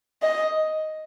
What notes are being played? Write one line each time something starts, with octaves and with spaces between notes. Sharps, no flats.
D#5